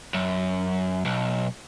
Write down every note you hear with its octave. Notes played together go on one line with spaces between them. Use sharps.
F#2
B1